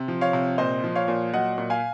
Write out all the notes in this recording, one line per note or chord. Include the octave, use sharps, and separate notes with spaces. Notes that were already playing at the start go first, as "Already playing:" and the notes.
Already playing: C3
F3
C#5 F5
C3
A#2 C5 D#5
F3
C#5 F5
A#2
F#3 D#5 F#5
A#2
F5 G#5